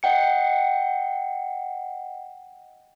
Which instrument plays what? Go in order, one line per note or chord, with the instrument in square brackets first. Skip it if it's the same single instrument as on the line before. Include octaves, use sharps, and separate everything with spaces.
[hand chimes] D#5 F#5 G5 C#7